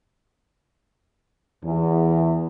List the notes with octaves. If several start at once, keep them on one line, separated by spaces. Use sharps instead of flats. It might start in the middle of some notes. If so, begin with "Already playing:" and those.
E2